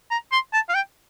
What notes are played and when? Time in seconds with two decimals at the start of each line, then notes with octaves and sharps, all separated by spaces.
0.11 A#5
0.33 C6
0.53 A5
0.69 F5
0.74 G5